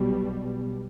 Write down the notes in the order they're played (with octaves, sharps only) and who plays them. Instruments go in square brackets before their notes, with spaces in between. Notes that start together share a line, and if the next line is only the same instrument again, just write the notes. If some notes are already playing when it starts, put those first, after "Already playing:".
Already playing: [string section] B1 B2 G3